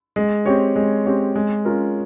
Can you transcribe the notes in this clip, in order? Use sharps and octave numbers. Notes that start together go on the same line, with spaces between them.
G#3
C4 G4 C#5
G#3
C4 G4 C#5
G#3
C#4 F4 A#4